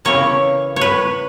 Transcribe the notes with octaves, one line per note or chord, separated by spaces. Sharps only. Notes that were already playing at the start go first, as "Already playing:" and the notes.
C#3 E3 A#3 C#5
C#5
B4